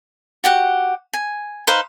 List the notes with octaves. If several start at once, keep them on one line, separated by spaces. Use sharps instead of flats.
F#4 G4 F#5
G#5
D#4 B4 C5 F5